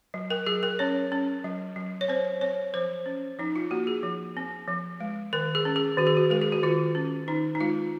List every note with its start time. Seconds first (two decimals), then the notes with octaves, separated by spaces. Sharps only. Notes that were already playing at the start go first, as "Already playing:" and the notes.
0.14 F#3
0.30 A#4
0.47 F#3 G#4
0.63 A#4
0.79 C#4 C#5
1.12 C#4
1.44 F#3
1.76 F#3
2.01 C#5
2.08 C4 C5
2.41 C4 C#5
2.74 F3 C5
3.06 C#4
3.39 F3 D#4
3.51 D#4
3.56 F4
3.71 A#3 F#4
3.87 G#4
4.03 F3
4.37 C4
4.68 F3
5.01 G#3
5.33 D#3 A#4
5.55 G#4
5.65 C#4
5.76 G#4
5.98 D#3 F#4
6.07 G#4
6.17 F#4
6.30 G#3 A#4
6.42 G#4
6.52 F#4
6.63 D#3 F4
6.95 C#4
7.28 D#3 D#4
7.55 D#4
7.60 G#3 F4